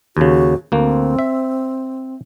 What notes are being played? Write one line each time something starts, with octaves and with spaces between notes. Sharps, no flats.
D#2 C#3 F#4
D2 A#3 C4
E5